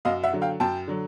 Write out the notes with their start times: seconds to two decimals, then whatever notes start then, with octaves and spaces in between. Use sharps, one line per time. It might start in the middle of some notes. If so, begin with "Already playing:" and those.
0.05 F#2 D#5 F5
0.23 E5 F#5
0.33 D3 F#3
0.42 F5 G5
0.60 F#2 G5 A5
0.87 D3 F#3